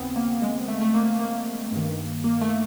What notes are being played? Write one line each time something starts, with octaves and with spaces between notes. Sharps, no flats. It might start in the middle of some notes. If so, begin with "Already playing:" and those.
Already playing: D#2 C#3 F3 B3 C4
A#3
G#3
A3
A3
A#3
A#3
A#3
G2 D#3
A#3
A3